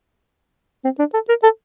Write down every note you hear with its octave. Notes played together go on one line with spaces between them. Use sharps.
C4
D4
A4
A#4
A4